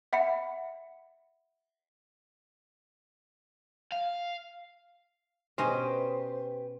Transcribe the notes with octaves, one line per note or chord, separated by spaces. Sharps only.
E5 F#5 B5 C#7
F5
B2 C#4 G4 B4 C5 D#5